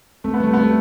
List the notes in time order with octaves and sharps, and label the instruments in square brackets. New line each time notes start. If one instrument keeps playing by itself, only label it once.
[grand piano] A3 [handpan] C4
[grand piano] B3
[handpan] G3 [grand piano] A3
[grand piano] B3 [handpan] C4
[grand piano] A3